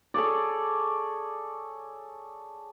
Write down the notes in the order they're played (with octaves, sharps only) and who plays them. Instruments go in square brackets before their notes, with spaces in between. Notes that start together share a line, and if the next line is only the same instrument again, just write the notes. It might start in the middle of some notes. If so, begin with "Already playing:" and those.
[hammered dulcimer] G#4 A4 C#5 D5